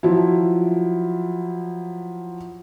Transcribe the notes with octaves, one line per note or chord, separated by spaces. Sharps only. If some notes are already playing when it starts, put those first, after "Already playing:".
F3 F#3 E4